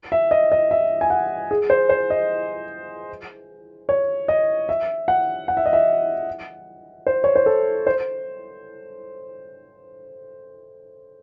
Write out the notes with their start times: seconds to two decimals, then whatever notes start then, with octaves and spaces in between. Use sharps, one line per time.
0.12 E5
0.31 D#5
0.52 D#5
0.71 E5
1.01 G#5
1.10 F#5
1.51 G#4
1.70 C5
1.89 C5
2.10 D#5
3.89 C#5
4.28 D#5
4.69 E5
5.08 F#5
5.48 F#5
5.57 E5
5.66 D#5
5.73 E5
7.07 C5
7.24 C#5
7.36 C5
7.46 A4
7.87 C5